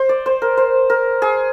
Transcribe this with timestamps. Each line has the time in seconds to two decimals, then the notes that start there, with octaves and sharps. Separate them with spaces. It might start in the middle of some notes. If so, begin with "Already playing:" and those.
Already playing: C5
0.09 D5
0.26 C5
0.42 A#4
0.57 C5
0.90 A#4
1.22 G#4